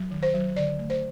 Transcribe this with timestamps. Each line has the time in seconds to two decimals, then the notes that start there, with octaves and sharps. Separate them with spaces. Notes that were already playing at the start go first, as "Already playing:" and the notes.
Already playing: F#3
0.11 D#3
0.23 C5
0.34 F#3
0.56 D3 D5
0.79 A3
0.90 C5